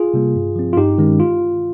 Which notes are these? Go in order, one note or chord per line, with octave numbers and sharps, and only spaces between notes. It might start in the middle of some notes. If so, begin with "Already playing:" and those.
Already playing: F4 G#4
C3 G3 A#3
G2
F3 C4
F4
G2 D#4 G4
D#3 G#3 C#4
F4